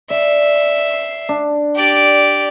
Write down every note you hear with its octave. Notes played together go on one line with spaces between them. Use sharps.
D5 E5 C7
D4
G4 D5